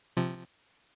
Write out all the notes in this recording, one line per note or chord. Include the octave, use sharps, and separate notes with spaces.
C3 F3